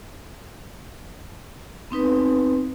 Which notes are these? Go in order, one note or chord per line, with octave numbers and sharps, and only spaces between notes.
B3 C4 D#4 B4